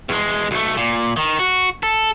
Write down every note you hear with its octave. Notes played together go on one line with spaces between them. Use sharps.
E2 G#3
B1 A3
A#2
D#3
F#4
A4